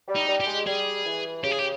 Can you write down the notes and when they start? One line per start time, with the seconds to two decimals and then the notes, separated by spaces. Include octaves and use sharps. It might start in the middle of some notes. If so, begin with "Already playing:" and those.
0.08 G3
0.16 D#4
0.29 G3
0.40 G4
0.47 G#3
0.66 G3 G#4
1.06 E3
1.43 C#3 G4
1.51 G#4
1.59 G4